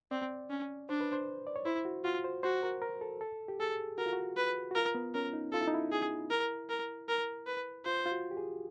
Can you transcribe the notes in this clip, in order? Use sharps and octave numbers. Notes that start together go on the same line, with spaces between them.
C4 D5
C#4
D4 C5
B4
C5
D5
C#5
E4 C5
F#4
F4 F#4
C5
F#4 C5
A#4
A#4
A4
A4
G4
G#4 A4
F#4 A#4
F4
F#4
B4
F#4
F4 A#4
B3
C#4 A#4
D#4
F4 A4
E4
D#4
E4
G#4
A#4
A#4
A#4
B4
F4 C5
F4
F#4
G4
G#4